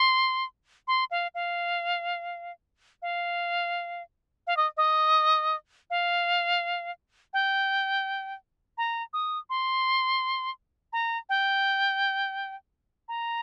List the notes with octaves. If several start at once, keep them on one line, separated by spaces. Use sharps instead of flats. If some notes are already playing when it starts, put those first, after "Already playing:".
Already playing: C6
C6
F5
F5
F5
F5
D#5
D#5
F5
G5
A#5
D#6
C6
A#5
G5
A#5